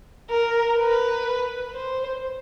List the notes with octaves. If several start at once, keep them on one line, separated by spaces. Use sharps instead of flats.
A#4
B4
C5